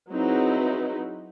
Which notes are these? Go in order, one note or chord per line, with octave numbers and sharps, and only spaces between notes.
F#3 C4 D#4 E4 G#4 B4